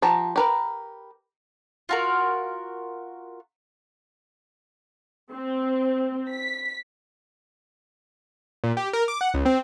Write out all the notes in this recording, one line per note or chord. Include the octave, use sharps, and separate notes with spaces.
F3 G4 A5 A#5
G4 A#4 B4
F4 F#4 A#4
C4
B6
A#2
G4
A#4
D6
F#5
C#2
C4